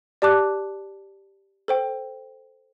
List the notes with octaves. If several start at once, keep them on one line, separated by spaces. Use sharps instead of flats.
G4 D5 A5 D6 F#6
A4 C5 G5